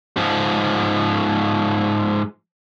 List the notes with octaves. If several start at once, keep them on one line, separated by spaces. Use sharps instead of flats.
G#2 F3